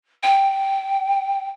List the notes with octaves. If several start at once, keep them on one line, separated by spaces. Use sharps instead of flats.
G5